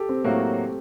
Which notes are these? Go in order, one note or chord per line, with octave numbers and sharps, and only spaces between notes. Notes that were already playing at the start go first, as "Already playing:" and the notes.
Already playing: G4 A4
C4
A2 F#3 A3 A#3 F#4